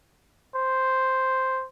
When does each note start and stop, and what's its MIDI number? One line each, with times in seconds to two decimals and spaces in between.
0.55 1.66 72